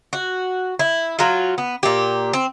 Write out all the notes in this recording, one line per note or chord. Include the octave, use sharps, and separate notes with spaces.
F#4
E4
F#3 F4
B3
A#2 G4
C4